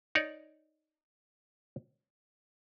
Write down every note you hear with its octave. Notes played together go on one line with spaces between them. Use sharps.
D#4 C#5 D5